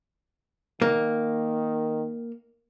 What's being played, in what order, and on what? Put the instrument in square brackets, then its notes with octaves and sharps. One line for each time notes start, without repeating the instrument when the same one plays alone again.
[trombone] D#3 [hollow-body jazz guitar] A#3